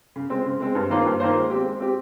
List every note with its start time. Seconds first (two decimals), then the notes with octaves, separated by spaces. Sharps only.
0.16 C#3
0.30 G#3 C4
0.46 C#3
0.60 G#3 C4
0.75 G2
0.90 D#3 A#3 F4 C5
1.06 G2
1.20 D#3 A#3 F4 C5
1.36 G#3
1.50 C4 G4
1.65 G#3
1.80 C4 G4